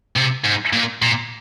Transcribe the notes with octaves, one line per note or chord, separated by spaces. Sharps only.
C3
G#2
A#2
A#2